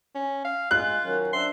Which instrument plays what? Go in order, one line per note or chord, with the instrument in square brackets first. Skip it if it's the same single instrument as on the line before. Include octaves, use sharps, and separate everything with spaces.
[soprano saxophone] C#4
F5
[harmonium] G#3 [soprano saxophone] F4 [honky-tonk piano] F#6
[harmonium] D#3 F#3 C#4
[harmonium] D4 C5 E5 [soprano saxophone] C6